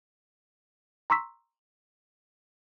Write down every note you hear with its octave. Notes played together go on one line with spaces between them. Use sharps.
A#5 C6 C#6 E6 B6